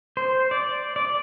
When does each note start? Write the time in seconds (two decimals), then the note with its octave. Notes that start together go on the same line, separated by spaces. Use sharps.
0.17 C5
0.51 D5
0.96 D5